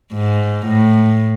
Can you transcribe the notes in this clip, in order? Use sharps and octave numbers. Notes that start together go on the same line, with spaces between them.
G#2
A2